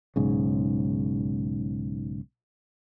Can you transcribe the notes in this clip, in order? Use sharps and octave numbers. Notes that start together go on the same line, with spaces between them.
B1 G#2 C#3